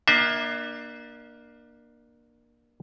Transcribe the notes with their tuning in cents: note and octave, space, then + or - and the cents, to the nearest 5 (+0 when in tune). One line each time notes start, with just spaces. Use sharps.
A#3 +20 D4 +30 E5 -25